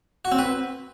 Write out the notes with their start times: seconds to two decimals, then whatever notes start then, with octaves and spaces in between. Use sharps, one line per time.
0.25 F#4
0.32 C4
0.39 B4